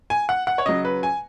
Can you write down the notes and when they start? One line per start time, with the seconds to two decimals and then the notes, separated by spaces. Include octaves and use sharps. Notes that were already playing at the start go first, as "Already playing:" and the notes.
0.10 G#5
0.29 F#5
0.47 F#5
0.58 C#5
0.66 C#3 F#3 D#5
0.85 B4
1.03 G#5